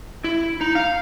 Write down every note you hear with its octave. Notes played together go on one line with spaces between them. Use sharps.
E4
D#4
F5